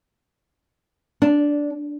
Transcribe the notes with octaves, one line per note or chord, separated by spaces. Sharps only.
D4